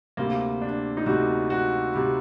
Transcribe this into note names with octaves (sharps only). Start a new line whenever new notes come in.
D2 C3 G3 A#3
D4
D#4
D2 C3 G3 F#4
F#4
C3 G3